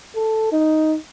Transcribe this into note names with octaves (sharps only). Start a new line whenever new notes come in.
A4
D#4